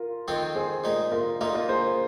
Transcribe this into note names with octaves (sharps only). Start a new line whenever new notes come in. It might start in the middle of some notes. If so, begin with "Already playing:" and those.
Already playing: F4 A#4
F2 D#3 C4 F4
G#4 C5
A#2 G#3 D#4
F4 A#4
A#2 A#3 D#4 F4 A#4
F4 A#4
G#4 C5